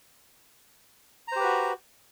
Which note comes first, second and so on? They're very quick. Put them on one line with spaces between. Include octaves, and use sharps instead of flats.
A#5 C5 G4 B4 F#4